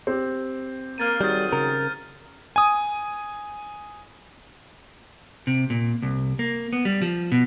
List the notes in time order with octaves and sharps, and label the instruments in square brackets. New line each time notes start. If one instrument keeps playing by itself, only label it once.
[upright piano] C4 G4
[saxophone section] A#3 [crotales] F6 A6 D#7
[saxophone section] D#3 F#3 G#4 [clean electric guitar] G3 [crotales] G6 A6
[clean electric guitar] C#3 A#4
[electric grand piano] G#5 D#6
[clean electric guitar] C3
A#2
C2
A#3
B3
G3
F3
B2